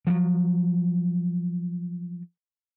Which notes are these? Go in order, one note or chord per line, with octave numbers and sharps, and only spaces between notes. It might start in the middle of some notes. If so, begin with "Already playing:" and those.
F3 F#3